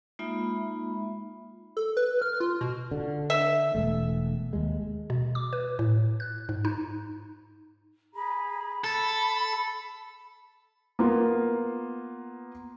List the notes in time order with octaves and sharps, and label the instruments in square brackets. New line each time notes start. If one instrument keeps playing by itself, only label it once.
[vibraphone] G#3 A#3 D#4 F4 E5 B5
[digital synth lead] A4
B4
F6
F4
B2
[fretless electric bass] D3
[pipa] E5
[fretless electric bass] E1 A3
D#2 G#3
[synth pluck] B2
D6
B4
A2
F#6
G#2
D#4
[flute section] G#4 A#5 B5
[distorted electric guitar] A4 [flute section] B5
[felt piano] A#3 B3 F4 A#4